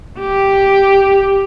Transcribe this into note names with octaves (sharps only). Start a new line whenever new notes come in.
G4